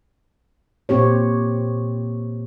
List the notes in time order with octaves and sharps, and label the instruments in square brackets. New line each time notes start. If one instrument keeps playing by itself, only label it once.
[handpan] A#2 C4 G4 C#5